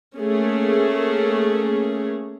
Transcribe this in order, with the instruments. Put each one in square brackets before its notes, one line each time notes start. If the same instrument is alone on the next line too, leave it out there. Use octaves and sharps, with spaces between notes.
[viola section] A3 A#3 C#4 G#4